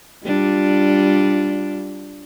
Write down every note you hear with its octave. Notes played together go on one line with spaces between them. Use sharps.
G3 D4 F4